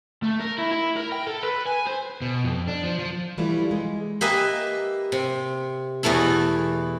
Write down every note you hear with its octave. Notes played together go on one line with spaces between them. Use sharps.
A3
A#4
E4
E4
A#4
G5
A4
B4
G#5
C5
B2
F2
D4
F3
F3
E3 F3 G3 A3 E4 F4
G#3
A#3 G4 B4 D#5 E5 G#5
C3
E2 B2 E3 A3 E4